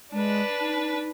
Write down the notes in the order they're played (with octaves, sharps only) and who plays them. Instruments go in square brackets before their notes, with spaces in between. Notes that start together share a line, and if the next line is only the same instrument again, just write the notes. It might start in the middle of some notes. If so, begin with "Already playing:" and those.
[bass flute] G#3 [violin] D4 B4
[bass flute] D#4